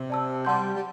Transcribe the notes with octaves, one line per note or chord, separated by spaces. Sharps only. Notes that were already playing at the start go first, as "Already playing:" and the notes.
Already playing: C3
D5 A5 E6
G3 F#5 A5 C6 G6
G3